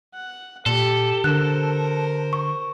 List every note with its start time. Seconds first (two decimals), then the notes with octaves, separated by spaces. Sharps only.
0.14 F#5
0.66 A#2 G4 A4
1.24 D3 A#4 C5 F#6
2.33 C#6